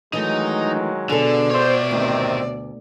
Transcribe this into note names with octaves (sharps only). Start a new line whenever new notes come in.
D#3 E3 F#3 G#3 A3 D#4
B2 D3 G#4 A4 D5
C5 C#5 E5
D2 C3 D#3 C4